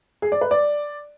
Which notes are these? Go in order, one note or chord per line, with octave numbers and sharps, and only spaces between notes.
G#4
D5
B4
D5